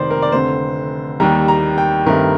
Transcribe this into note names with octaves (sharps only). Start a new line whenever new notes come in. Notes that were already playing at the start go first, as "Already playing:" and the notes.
Already playing: F1 D#3 C5 D5
A#4
D5
F1 F2 D3 C5
D#2 D#3 G3 A#5
A#5
G5
G2 D#3 A3 C4 A#4